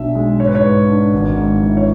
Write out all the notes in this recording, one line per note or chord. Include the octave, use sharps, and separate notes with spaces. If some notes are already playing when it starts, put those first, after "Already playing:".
Already playing: B1 D4 E5
G#3
G#2 C#5
B4
C#5
G#2
D4
G#1
G#2
E3
C#5